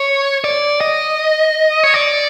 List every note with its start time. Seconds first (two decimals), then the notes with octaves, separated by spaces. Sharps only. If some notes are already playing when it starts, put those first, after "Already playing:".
Already playing: C#5
0.44 D5
0.81 D#5
1.83 C#5
1.94 D5